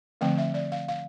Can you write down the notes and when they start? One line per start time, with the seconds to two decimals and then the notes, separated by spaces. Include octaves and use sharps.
0.21 D3 F3 A3 C4 G5
0.38 E5
0.54 D5
0.72 F5
0.88 F5